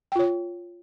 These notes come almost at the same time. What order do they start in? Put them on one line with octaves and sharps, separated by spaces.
G5 F4 C#5